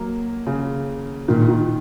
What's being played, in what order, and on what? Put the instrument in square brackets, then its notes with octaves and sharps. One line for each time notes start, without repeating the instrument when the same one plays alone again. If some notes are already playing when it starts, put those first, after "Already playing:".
Already playing: [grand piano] F#3 A#3
C#3
[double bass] A#2 [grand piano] D#3
[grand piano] D#3